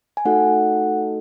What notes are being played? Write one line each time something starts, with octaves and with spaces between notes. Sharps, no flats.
G#5
A3 D#4 F#4 A4 F#5